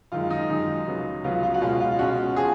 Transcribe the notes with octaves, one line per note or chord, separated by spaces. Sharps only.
F#2 D#3 G#3 F4
D#4
F#2 D#3 G#3
C#2 C#3 F#3 B3
C#2 C#3 F#3 B3 F4
F4
F#4
B2 G#3 C#4 F4
F4
B2 G#3 C#4 F#4
F3 G#4